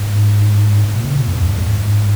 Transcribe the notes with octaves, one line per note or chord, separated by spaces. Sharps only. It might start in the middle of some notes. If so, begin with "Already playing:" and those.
Already playing: G#2
A#2
C#3
A#2
F2
F2
G#2
F2
G#2